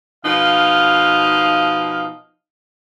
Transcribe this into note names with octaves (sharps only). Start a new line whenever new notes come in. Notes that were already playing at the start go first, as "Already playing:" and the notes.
B2 F3 D#4 F5